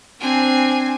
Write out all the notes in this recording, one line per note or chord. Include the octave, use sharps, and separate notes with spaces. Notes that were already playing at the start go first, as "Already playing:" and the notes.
C4 D4 G#5